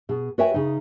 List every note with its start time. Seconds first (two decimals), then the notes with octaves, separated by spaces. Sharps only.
0.09 B2 G#4
0.38 F#4 B4 C#5 E5 G5 G#5
0.54 C#3 D#4